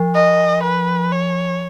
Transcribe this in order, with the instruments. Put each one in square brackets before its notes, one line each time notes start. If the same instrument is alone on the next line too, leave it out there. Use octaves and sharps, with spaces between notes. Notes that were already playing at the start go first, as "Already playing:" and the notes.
Already playing: [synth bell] F3
[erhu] D#5
B4
C#5